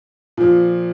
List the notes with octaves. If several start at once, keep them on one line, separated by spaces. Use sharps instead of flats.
A#2 F3